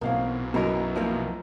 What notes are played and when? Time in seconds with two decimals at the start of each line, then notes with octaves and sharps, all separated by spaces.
0.01 B1 B2 E3 A#3 C4 F5
0.54 F#2 B2 E4 F#4 A#4 B4 D#5 A#5
0.95 F2 F3 A#3